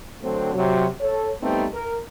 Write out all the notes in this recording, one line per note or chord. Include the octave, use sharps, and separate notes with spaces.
D3 F#3 A3 C4
C3 F#3
A4 C#5
G3 A3 B3 C4 D#4
A#4